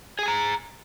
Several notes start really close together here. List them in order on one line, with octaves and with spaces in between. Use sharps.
G#4 G#5 A#5